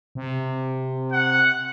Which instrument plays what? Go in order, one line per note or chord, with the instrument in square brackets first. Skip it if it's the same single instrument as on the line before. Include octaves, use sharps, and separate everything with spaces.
[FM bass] C3
[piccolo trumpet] F#5